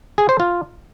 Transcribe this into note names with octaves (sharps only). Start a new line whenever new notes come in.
G#4
C5
F4